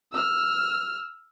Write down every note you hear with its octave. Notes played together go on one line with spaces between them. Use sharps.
E6 F6